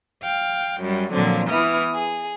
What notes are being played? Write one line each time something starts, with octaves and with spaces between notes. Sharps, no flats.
F5 G5
F#2 G3
A#2 D3 F3 F#3 C4
E3 B3 E4 D#6 F6
G#4